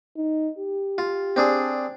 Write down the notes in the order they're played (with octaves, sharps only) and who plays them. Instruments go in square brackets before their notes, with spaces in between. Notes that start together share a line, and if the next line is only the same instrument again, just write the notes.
[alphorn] D#4
G4
[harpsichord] F4
C4 D4 G#4